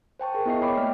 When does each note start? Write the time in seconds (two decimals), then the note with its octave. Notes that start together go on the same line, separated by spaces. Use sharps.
0.19 C5 G5 A5 C#6
0.35 G#4 A#4
0.46 B3 E4 D#5 E5 C7
0.61 C#5 G5 B5 D6 C7
0.77 A3 A#3 E4 D5 G5 F6